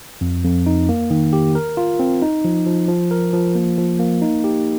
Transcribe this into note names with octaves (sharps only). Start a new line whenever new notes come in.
F2
F2
D#4
A#3
D#3
G4
A#4
F4
C4
D#4
F3
F3
F3
A#4
F3
A#3
F3
A#3
D#4
G4